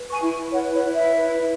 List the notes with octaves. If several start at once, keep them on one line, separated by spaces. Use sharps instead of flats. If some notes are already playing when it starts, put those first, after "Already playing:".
Already playing: B4
G#5 C#6
E4
B4 C#5 F#5
C#5
E4
E5
B4